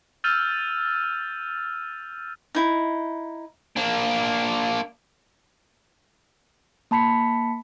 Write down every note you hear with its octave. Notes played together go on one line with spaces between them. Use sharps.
E6 F6 G6 A6 D#7 F7
D#4 E4
A#3 D4
A#3 A5 B5 B6 C#7